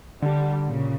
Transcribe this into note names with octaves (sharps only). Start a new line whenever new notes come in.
D3 G3 D4
A#2 C#3